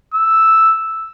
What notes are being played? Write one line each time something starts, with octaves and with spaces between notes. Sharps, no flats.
E6